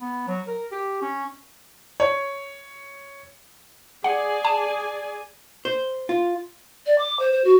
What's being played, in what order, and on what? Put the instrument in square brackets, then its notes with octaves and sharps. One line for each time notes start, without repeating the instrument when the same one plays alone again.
[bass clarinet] B3
F#3
A#4
G4
C#4
[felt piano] C#5
[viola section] G#4 D5 G#5 [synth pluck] F#5
[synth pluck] A5
[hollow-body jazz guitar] C5
F4
[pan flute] D5
D6
C5
C5
F#4